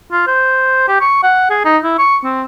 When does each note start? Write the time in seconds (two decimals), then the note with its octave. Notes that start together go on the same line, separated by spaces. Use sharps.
0.12 F4
0.27 C5
0.88 G4
1.01 C#6
1.23 F#5
1.50 G#4
1.65 D#4
1.84 E4
1.98 C#6
2.24 C4